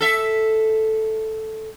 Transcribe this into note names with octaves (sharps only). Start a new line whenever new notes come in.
A4 E5